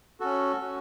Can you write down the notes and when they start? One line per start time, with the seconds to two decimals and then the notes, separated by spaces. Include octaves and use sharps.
0.20 C#4 F#4 A4
0.61 C#4 F#4